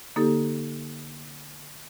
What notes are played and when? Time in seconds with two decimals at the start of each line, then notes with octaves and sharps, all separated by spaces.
0.16 D3 A#3 D#4 G4 A4